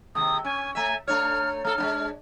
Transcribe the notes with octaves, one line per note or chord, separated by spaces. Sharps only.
D#2 G#2 C3 D#6
C#4 G#5
A3 E5 G#5
A3 D4 C#5 F6
A3 A4 F6
G#3 A#3 D4